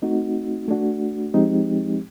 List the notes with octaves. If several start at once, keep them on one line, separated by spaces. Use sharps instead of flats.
A3 C4 D#4 F#4
A3 D4 F#4
F3 G#3 C4 D#4 G4